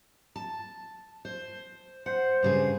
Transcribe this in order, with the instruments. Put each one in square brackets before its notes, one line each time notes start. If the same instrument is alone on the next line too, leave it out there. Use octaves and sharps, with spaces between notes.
[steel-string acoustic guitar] A5
C5
[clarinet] C5 [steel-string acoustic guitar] F#5
[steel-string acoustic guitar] G2 C#3 G#4